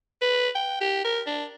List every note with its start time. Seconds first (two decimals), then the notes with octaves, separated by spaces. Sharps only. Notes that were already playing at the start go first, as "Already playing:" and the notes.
0.21 B4
0.55 G5
0.81 G4
1.04 A#4
1.27 D4